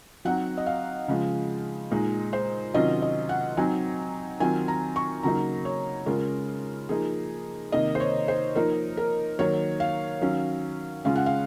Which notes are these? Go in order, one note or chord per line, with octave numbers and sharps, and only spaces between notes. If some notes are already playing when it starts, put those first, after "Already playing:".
F#3 C4 D#4 F#5
D#5
F5
C#3 F3 G#3
A#2 G#3 D#4
C5
C3 D#3 F#3 C#4 F4 D#5
D#5
F#5
F#3 C4 D#4 G#5
D#3 F#3 C4 F4 G#5
A#5
C#6
C#3 F#3 A#3 D#4 A#5
C#5
C#3 G#3 C#4 F4 A#4
F3 A#3 D#4 G#4
C3 D#3 A#3 D#4 D#5
C5
C#5
C5
F3 A#3 D#4 A#4
A#4
D#3 F#3 A#3 C#5
F5
D#3 F#3 C#4
C#3 G#3 C#4 F4 F5
F#5
F5